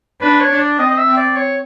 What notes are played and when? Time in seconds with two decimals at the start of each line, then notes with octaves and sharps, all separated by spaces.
0.21 D4 B4
0.41 C#5
0.50 D4
0.60 D5
0.79 C4 D#5
0.91 D#5
0.98 E5
1.07 C4
1.17 D5
1.36 C#5